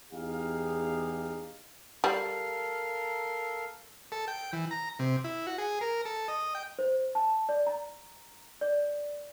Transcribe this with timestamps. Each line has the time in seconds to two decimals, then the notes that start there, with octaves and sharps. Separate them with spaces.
0.12 E2 D#4 G4 G#4 F5
2.04 G3 A4 A#4 F5
4.12 A4
4.28 G5
4.53 E3
4.71 A#5
4.99 C3
5.24 E4
5.47 F#4
5.58 G#4
5.81 A#4
6.05 A4
6.28 D#5
6.55 G5
6.79 C5
7.15 A5
7.49 D5
7.67 A#5
8.61 D5